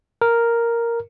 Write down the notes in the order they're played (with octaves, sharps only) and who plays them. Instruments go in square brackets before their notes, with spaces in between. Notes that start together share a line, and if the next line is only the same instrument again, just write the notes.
[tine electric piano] A#4